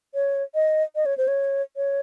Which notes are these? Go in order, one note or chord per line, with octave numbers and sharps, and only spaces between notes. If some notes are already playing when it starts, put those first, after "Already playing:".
C#5
D#5
D#5
C#5
C5
C#5
C#5